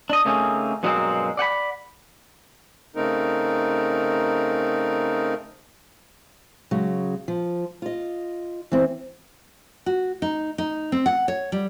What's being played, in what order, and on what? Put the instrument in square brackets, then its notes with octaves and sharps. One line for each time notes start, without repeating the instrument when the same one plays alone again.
[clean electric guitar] D4 D#5
C#3 A3 A#3 C4 C#4 D#4
G2 B2 F#3 G#3 A#3 C4
D5 F#5 G5 B5
[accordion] C#3 A3 C4 D#4 A#4
[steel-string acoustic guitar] C#3 F#3 G#3
F3
F4 D#5
E3 C4
[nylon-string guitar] F#4
D#4
D#4
C4
F#5
C#5
G3